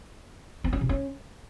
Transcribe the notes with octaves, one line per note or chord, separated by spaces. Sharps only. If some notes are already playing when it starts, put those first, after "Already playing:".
C4
C#4
C3
C#4